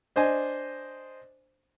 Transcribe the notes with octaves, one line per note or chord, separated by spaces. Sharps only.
D4 C5 D#5 G#5